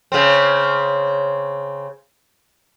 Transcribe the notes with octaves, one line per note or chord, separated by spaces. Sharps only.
C#3 C4